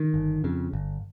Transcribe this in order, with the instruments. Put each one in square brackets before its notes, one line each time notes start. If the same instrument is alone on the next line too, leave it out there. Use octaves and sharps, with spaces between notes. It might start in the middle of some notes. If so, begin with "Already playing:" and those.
Already playing: [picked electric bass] D#3
G1
F2 C#3
G1